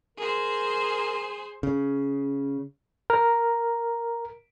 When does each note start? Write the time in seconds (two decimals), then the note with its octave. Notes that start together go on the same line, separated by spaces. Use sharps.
0.18 G#4 A#4 C5
1.63 C#3
3.10 A#4